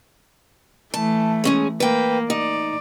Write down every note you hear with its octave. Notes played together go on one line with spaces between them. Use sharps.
E3 A3 A5
G#3 C#4 G#4
A#3 B4 G5
D#4 D5